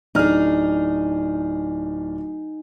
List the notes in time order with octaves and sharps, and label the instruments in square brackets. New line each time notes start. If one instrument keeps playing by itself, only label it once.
[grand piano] D1 D4 F6 [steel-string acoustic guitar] D#4 G#4